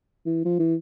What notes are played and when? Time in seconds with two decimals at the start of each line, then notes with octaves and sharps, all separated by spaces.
0.26 E3
0.45 F3
0.60 E3